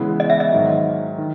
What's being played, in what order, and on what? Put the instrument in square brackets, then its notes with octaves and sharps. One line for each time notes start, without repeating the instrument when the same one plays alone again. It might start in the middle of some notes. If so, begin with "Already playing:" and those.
Already playing: [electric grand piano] C#3 E3 G#3 B3 E4
[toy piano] D#5
E5
D#5
[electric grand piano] G#2 D#3 F#3
D#3